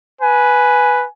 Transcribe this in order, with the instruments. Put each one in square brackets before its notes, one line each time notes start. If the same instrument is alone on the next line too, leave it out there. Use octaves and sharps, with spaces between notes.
[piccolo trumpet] B4 [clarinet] G#5